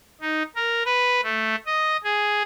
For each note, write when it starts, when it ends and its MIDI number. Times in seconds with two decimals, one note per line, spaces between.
0.21 0.43 63
0.56 0.83 70
0.86 1.21 71
1.23 1.55 57
1.66 1.97 75
2.04 2.43 68